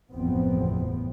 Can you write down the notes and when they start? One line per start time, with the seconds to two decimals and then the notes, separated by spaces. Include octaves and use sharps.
0.13 F#1 E2 A2 F3 B3 C4